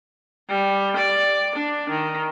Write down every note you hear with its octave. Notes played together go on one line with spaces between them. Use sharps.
G3
D5
D4
D#3